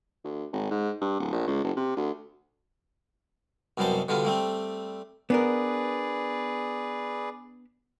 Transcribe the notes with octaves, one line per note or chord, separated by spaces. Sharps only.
D2
G#1
G#2
G2
D1
A#1
C#2
F#1
C3
D2
C2 F#2 B2 G3 C5 A5
B2 D3 G3 F4
G3 A3 C4
B3 D4 G#4 A#4 B4 D5